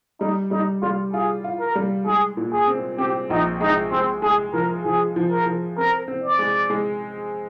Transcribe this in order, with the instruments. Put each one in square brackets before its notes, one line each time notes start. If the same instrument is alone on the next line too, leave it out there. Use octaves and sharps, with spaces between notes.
[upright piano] G3 [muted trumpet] D#4
[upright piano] G3 [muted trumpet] D#4
[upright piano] G3 [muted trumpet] F4
[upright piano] F4 [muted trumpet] G#4
[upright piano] F4
[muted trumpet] A#4
[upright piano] G3
[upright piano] G#3 [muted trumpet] G#4
[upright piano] A#2
[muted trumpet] G#4
[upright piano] C4
[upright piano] C4 [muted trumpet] G4
[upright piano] A#1 [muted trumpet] D#4
[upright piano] G#3 [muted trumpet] D#4
[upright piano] G#3 [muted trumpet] C4
[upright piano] G#3 [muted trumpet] G#4
[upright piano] F3 [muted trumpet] A#4
[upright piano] F3 [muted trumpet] G#4
[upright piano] F3
[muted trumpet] A#4
[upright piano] F3
[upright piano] C4 [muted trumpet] A#4
[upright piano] C4
[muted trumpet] D5
[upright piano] G#3
G#3